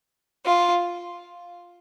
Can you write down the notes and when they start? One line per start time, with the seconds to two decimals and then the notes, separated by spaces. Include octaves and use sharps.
0.46 F4